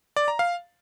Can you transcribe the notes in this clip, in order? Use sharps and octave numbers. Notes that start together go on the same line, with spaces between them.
D5
A#5
F5